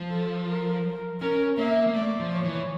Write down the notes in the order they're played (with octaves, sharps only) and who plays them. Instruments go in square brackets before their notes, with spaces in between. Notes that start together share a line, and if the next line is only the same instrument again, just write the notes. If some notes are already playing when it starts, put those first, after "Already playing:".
Already playing: [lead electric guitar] F3
[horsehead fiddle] A4
A#4
[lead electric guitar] C#4 [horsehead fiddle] A#4
[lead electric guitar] A#3 [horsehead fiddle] E5
[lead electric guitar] A#3
[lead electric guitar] A3 [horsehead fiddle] D5
[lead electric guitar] F3
[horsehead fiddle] C#5
[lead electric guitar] E3